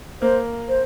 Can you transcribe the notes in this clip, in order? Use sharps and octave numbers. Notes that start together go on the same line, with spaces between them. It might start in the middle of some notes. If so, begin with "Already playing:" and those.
A#3 C5
C5